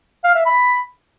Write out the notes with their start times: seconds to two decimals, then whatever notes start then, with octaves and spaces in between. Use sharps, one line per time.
0.24 F5
0.35 E5
0.46 B5